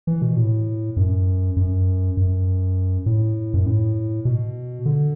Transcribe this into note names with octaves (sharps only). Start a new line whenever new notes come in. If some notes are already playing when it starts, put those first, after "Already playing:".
E3
B2
A2
F#2
F#2
F#2
A2
F#2
A2
B2
D3